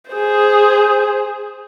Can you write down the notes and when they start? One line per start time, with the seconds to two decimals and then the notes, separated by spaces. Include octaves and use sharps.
0.11 G#4 C5